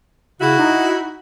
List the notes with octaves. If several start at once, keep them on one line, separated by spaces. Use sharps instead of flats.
C#3 E4 F#4
D#4